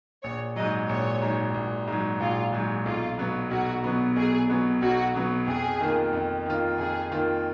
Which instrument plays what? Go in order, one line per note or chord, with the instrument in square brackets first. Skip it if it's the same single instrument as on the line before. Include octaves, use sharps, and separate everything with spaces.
[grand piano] A#1 [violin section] C#5
[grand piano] G#2 F#3 [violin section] D#5
[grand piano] A#1 [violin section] C#5
[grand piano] G#2 F#3
A#1
G#2 F#3
[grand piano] A#1 [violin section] F4
[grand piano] G#2 F#3
[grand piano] B1 [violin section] F4
[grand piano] B2 F#3 B3
[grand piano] B1 [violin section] F#4
[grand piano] B2 F#3 B3
[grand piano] B1 [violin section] G#4
[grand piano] B2 F#3 B3
[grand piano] B1 [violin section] F#4
[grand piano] B2 F#3 B3
[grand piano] F2 [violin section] G#4
[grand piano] D#3 A#3 F4
F2
D#3 A#3 F4
[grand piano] F2 [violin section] G#4
[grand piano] D#3 A#3 F4